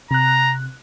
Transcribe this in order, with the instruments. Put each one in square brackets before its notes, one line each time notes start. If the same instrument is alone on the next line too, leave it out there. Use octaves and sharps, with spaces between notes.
[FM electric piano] C3 F#6 [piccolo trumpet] A#5